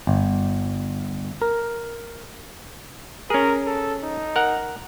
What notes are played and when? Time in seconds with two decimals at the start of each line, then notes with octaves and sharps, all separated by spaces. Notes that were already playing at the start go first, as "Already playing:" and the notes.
0.07 G1
1.42 A#4
3.30 C#4 G#4 A#4
3.66 A4
4.03 D#4
4.36 A#4 F#5